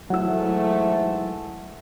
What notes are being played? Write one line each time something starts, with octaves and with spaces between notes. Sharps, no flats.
G#2 E3 F#3 A3 E4 F#5 E6